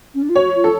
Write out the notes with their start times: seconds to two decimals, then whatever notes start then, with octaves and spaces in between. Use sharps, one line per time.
0.14 C#4
0.22 D4
0.29 F4
0.35 F#4 C#5
0.55 F4
0.64 A4